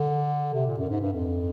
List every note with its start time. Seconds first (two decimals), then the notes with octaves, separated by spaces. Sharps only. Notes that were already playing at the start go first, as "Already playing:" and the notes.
Already playing: D3
0.54 C3
0.66 A#2
0.78 F#2
0.89 G#2
1.01 G2
1.13 F2